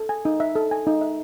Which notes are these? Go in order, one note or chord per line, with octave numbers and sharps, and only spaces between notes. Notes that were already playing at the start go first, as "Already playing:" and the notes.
Already playing: A4
G#5
D#4
E5
A4
G#5
D#4
E5